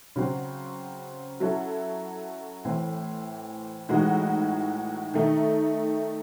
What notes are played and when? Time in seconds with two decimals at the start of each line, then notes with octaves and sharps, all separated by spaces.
0.16 C#3 F#3 C4
1.40 F#3 C#4 E4 A4
2.65 A2 E3 C4
3.89 A2 E3 G#3 D#4 F#4
5.14 D#3 A3 D#4